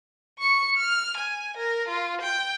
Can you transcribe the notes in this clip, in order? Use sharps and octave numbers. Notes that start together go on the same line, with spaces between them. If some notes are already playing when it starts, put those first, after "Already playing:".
C#6 C#7
F6
G#5
A#4
F4
G5